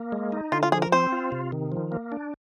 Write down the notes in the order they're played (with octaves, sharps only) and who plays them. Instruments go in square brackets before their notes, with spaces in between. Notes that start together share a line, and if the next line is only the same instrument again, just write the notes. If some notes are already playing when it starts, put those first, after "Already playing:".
Already playing: [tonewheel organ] A#3
G#3
D#4
[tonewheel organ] D3 [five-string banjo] F4
[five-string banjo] F4
[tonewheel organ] F3 [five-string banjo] G#4
[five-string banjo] A#4
[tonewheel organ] C4 [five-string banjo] C5
[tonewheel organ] F4
C3
D#3
F3
A#3
D4